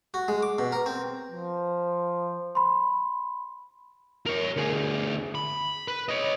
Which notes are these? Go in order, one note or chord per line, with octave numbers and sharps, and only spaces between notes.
F#4
G#3
D6
B2
A#4
C4
F3
B5 C6
A#4 C#5
D2 G#4
B5
B4
C#5 D#5